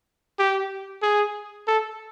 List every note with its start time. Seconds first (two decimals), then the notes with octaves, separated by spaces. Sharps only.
0.39 G4
1.02 G#4
1.67 A4